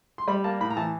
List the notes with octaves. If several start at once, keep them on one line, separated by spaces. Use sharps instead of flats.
C6
G3 B5
A#3 A5
A2 B5
A#5
E3 A5